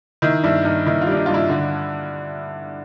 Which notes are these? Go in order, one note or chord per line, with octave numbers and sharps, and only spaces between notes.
D#3 E4
G2 E4
G2 D#4
D#3 E4
F4
G3 D4
D#4
G2 F4
E4
D3